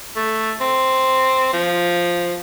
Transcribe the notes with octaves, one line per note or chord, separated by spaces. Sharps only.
A3
C4
F3